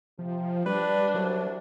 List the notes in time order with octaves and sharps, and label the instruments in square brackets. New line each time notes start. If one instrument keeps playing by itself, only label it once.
[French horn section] C3 [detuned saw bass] F3
[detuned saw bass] G3 [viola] D4 [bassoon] B4 [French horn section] D5
[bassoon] C2 [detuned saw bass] F#3